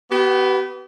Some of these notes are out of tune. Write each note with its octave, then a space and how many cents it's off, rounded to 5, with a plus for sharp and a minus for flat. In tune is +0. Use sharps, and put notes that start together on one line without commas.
B3 +0 G4 -40